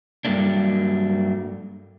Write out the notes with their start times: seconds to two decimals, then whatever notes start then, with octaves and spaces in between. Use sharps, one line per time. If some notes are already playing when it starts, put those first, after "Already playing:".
0.25 G2 F#3 G3 A3 A#3 D4